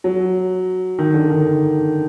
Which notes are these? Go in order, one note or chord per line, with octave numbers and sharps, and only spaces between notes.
F#3
D#3
D3
D#3